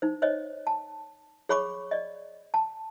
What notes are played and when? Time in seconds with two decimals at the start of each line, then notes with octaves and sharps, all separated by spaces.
0.02 D#4 C5
0.22 C5 C#5 D#5
0.67 A5
1.49 G#4 C#5 B5 C#6 D6
1.91 D5 D#5
2.54 A5